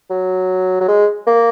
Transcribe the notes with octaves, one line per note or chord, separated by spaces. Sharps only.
F#3
F#3
G#3
A#3